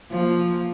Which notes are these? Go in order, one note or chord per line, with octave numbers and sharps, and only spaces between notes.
F3 A#3